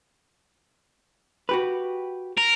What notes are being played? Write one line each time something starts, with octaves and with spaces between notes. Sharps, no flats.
F#4 G4 B4
A#4